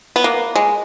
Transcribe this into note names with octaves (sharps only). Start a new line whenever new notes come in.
B3
A#3
G#3